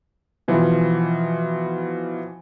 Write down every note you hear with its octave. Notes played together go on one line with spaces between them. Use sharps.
B2 E3 F3